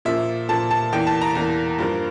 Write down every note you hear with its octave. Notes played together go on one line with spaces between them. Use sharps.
A#2 F3 A#3 E5
A#2 F3 A#3 A5
A5
E2 E3 A#3 G5
A5
A#5
E2 E3 A#3
G2 F3 A#3